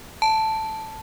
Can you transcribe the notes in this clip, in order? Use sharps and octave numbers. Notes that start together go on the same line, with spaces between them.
A5